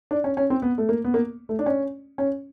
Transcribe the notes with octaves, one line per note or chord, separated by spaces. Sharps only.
D4
C#4
C#4
C4
B3
A3
A#3
B3
A#3
A3
D4
C#4
C#4